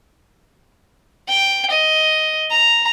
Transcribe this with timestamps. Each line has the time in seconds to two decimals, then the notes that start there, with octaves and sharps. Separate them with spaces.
1.28 G5
1.70 D#5
2.51 A#5